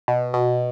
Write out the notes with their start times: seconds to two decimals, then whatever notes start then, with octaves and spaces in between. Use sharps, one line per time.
0.08 B2
0.34 B2